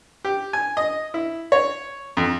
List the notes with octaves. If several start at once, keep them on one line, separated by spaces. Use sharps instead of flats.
G4
G#5
D#5
E4
C#5
F2